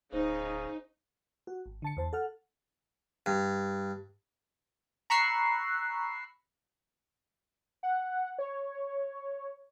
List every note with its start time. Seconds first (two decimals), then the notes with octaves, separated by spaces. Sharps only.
0.12 D1 C#3 D#4 C5
1.47 F#4
1.66 G#1
1.82 D3 A5 C#7
1.97 E2 C5 A5
2.13 A4 F#5 F6
3.26 G2
5.10 A#5 B5 C#6 E6 F#6 C7
7.83 F#5
8.39 C#5